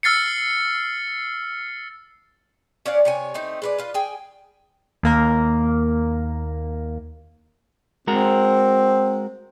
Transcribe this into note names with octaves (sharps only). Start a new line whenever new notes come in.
E6 F6 A6 C7 C#7
C#4 D5 F5 F#5
C3 C#5 G#5
A3 C4 D#4
G#3 B4 D5
F4 B4
G#4 G5 G#5
D#2 A#3 A#4
G#3 C4 F#4 A#4